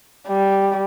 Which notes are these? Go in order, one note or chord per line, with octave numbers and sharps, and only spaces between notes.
G3